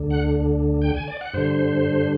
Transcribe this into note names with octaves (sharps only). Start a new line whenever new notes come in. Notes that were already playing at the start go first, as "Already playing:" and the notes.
Already playing: D2 D3
F#5
G5
G#5
D5
F#5
G2 D3 C5